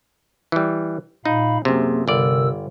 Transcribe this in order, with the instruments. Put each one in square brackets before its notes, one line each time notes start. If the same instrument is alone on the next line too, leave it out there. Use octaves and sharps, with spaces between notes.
[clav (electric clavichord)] E3 G3
[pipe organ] A#2 F5 B5 [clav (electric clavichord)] D#4
[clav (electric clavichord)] F#2 C3 [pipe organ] A#3 G#4
[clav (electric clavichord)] G1 D5 [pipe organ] C3 A#4 E6